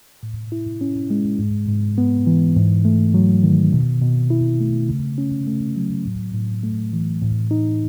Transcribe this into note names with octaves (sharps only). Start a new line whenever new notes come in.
A2
E4
C#4
G#3
G#2
G#2
B3
E3
G#2
A3
F#3
D#3
B2
B2
E4
A3
C#3
C#4
A3
F#3
A2
A2
A3
E3
A2
D#4